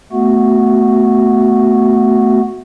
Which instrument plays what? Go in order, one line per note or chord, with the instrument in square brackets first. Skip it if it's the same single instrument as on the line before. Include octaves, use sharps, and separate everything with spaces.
[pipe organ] A3 B3 F#4